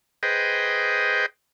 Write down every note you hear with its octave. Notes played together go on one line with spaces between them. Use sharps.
G#4 B4 C5 D#5 G5